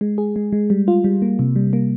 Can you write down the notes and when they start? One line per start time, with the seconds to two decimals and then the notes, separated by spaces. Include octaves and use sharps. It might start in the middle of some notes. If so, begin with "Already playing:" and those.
0.01 G#3
0.18 G#4
0.36 G#3
0.52 G#3
0.70 G3
0.88 F4
1.04 G3
1.22 A#3
1.39 C3
1.56 G3
1.73 A#3